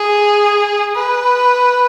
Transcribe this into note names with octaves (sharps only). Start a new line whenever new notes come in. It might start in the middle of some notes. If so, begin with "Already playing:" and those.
Already playing: G#4
B4